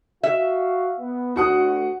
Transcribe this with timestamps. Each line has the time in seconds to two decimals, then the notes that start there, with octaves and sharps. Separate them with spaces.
0.23 F#4 E5 F5
0.99 B3
1.36 D2 F#4 F#5 D#6